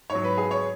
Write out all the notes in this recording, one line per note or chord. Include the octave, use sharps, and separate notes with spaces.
G#2 C#5
F#3
B4
G#4
C#5